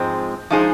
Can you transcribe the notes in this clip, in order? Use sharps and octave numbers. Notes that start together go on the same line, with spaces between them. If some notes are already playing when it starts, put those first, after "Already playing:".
Already playing: G#2 F3 G#3 C4
F3 G#3 D#4 G#4 C5